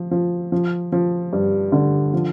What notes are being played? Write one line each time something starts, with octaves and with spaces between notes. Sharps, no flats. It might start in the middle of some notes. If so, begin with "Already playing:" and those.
Already playing: F3
F3
F3
F3
G2
D3
F3